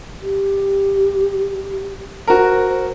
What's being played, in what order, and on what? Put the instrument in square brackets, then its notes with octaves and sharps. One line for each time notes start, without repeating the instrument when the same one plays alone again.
[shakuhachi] G4
[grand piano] F#4 A#4 [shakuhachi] C5